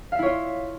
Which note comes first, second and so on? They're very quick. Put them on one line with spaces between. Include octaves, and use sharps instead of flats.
F5 E5 E4 C#5 F4